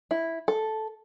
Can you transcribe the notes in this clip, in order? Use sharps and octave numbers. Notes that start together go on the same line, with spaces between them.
E4
A4